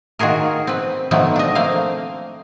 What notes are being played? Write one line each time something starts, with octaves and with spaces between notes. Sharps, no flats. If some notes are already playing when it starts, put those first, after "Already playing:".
D#3 F4 F#4 G#4 A#4
C4 B4
B2 D#3 F3 F#3 A3 B3
D4 D#5
A3 A#3 C4 F5